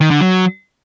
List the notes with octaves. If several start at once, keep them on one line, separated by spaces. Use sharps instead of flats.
D#3
D3
F#3